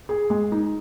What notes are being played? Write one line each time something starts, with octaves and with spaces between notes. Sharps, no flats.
G#4
G#3
D#4